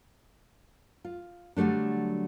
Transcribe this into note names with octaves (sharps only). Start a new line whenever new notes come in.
F4
D3 F#3 G3 A3 D4